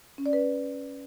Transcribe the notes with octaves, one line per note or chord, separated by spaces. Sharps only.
C#4
D5
B4